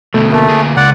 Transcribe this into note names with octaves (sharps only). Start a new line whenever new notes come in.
D2 B2 A3
A3 A#3
D2 G#4
C#2 D5 F#5